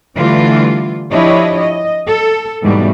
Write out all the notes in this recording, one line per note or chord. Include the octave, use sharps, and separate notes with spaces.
D3 E3 G3 A3 F4
F3 D4 E4 G4 C#5 D#5
D#5
A4
E2 G#2 B2 G3 A3